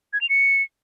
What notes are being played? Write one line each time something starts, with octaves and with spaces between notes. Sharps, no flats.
G#6
F7
C#7